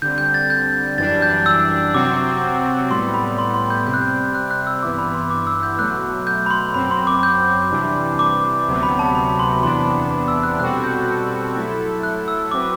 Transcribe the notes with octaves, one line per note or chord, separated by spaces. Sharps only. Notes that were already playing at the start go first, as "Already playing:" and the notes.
D3 G3 C4 G6
G6
A6
G6
F#2 E3 G3 D4 A6
G6
E6
C3 F#3 C4 F#4 D6
A2 G3 B3 C6
B5
C6
C6
G6
C3 G3 C4 G6
F#6
G6
F#6
F#6
E6
G2 E3 B3 E4 D6
B5
C6
D6
E6
G6
B2 F#3 A3 F#6
G6
B5
C6
F#2 F#3 C4 B5
C6
D6
G6
C3 E3 G3 D4
D6
D2 C3 F#3 B3
B5
A5
B5
C6
E2 C3 E3 B3 D4 C6
D6
E6
F#6
B2 G3 C4 F#4 A4 F#6
G6
F#3 A3 E4 A4
F#6
E6
F#3 C4 F#4 B4 D6